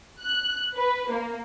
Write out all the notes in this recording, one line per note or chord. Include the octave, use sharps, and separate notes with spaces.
F#6
B4
A#3